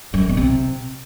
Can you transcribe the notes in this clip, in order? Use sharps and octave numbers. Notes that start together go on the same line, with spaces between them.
F#2
G2
B2
C3